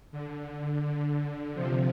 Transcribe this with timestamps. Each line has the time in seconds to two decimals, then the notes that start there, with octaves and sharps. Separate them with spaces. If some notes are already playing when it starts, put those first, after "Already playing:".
0.12 D3
0.47 D3
0.83 D3
1.54 C3 F3